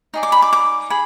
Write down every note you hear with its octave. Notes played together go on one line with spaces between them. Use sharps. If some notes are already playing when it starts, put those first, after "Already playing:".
D#4 G#4 D5
D6
B5
D6
D6
G#4 B5